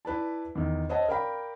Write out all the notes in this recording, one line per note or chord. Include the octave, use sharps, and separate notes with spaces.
E4 B4 D5 A5
E2 D#3
C5 C#5 D#5 E5 F#5 A5
A#4 D5 F5 G5 B5